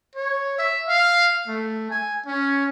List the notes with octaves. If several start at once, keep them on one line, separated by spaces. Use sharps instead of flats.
C#5
E5
F5
A3
G#5
C#4